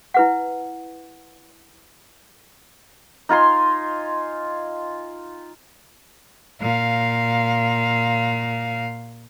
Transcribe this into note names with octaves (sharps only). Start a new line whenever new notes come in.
E4 B4 F#5
D#4 F4 G#5 C6
A#2 F5